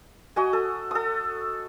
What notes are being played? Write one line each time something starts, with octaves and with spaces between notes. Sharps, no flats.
F#4 D#5 G#5
A4
A4 D#6